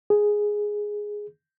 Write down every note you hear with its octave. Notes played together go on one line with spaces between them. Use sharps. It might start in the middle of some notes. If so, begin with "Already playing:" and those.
G#4